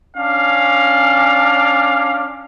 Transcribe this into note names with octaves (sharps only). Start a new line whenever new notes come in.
C#4 D4 F5